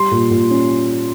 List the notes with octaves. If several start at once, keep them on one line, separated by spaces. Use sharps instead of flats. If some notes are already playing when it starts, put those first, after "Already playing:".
Already playing: G3 C6
A#2
A#2
C#4